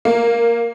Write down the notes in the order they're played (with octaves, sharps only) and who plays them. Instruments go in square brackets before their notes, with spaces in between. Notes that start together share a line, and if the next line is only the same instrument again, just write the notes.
[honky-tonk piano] A#3